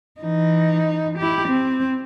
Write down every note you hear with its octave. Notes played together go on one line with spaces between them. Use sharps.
E3 D#4
E4 G4
C4